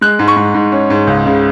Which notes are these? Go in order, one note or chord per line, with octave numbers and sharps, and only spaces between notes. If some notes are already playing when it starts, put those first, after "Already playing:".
G#3 F#6
G#2
C#6
G#2
G#2
C#4
G#2
C#2
C#3